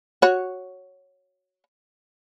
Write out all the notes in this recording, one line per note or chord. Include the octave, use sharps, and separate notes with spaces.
F#4 C#5